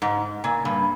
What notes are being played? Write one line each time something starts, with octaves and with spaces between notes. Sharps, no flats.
G#2
A#2
G2